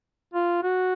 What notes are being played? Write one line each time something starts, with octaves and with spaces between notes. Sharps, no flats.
F4
F#4